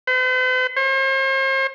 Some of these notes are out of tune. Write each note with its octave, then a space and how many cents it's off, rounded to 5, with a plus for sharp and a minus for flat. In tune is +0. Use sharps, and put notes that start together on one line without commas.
C5 -45
C5 +45